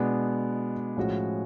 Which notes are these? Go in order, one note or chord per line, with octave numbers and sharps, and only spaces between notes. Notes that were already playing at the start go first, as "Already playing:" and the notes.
Already playing: B2 G#3 B3 D4
A2 F3 G#3 C#4 F#4